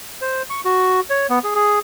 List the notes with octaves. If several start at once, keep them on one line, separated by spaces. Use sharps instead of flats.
C5
C#6
F#4
C#5
B3
G#4
G#4